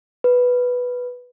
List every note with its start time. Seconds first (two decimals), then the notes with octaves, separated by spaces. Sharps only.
0.24 B4